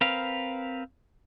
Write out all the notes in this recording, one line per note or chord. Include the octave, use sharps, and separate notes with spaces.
C4 A#4 B4 F5